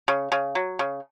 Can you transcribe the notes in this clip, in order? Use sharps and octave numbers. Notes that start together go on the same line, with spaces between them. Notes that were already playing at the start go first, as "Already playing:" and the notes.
C#3
C#3
F#3
C#3